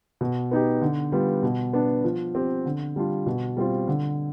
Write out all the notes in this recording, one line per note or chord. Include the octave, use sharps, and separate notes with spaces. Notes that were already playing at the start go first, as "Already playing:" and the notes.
B2
B3 D#4 G4
D3
G3 B3 F4
B2
B3 D4
F3
C4 G4
D3
G3 D4 F4
B2
G3 C4 F4
D3